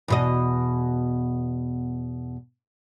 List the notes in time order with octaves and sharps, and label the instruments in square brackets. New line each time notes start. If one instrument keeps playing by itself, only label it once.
[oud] E2 B2 D#5